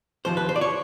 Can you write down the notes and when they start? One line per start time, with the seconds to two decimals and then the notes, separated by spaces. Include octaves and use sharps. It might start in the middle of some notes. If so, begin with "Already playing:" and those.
0.25 D#2 C#3 F3 C5
0.37 B4
0.49 C5
0.56 D5
0.61 C#5